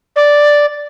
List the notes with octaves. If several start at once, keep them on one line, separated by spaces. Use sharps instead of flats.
D5